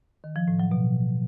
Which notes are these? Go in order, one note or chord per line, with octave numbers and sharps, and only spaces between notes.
D#3
F3
A2
F#3
B2